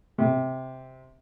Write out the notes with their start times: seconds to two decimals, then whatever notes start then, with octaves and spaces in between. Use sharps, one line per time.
0.18 C3